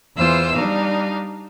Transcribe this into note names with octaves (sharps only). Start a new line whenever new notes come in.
E2 E3 F4 C5 E6
G3 D4 D#4 F5